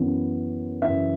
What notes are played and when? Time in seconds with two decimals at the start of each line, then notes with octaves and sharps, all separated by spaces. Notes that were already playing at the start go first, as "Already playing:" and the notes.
Already playing: F#2 E3 B3
0.82 F#2 C#3 E3 E5